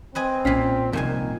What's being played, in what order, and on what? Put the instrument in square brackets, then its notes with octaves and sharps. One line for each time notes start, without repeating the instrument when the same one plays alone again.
[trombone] C4 [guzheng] B4 D#5 G#5
[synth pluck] B1 C#4 B6 [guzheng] A#2 F5
[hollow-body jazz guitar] C2 F#2 A#2 [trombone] D#3 [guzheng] F3 G#5